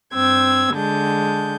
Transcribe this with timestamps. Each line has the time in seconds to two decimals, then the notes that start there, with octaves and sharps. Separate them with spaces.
0.14 G2 C4 E6 G#6
0.73 D3 G#3 A5 G6